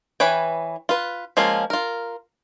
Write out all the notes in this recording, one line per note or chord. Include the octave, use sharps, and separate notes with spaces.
E3 B4 C#5 G5
F4 B4
F3 G#3 A#3 C#4 F4
F4 A#4